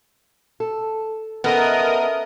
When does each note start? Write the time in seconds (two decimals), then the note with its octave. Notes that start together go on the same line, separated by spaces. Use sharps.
0.60 A4
1.44 B3 C#4 A4 A#4 D#5 E5 D#6